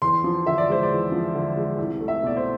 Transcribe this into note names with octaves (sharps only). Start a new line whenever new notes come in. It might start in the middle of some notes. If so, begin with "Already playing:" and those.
E2 C6
F3
D3 E5
D5
G#3 C5
D5
E2
F3
D3
G#3
C2
A3
E5
B2 D5
C5